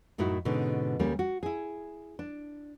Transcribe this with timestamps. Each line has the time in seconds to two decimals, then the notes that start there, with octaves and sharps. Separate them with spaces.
0.18 F#2 A2 D#4 E4 F#4
0.45 G#2 B2 D3 C#4 D#4
0.99 D2 G3 A#3 C#4
1.19 F#4
1.43 E4 G#4
2.19 D4